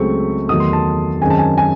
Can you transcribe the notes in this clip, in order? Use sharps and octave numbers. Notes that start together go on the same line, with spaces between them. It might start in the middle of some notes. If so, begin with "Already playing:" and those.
Already playing: C#2 C#3 F#3 A3 C4 C#6
E2 D#3 F#3 A3 D#6
C6
A5
F#2 D#3 G#3 C4 G#5
A5
G#5
G#5